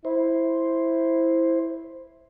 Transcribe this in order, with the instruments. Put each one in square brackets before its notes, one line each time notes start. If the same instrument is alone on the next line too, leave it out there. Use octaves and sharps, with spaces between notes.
[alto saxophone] E4 [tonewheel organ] C5